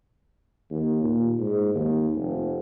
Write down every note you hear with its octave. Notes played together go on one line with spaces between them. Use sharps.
D#2
A#2
G#2
D#2
F1